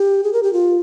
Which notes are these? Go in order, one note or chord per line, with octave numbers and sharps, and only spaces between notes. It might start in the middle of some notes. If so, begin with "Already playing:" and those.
Already playing: G4
G#4
A#4
G4
F4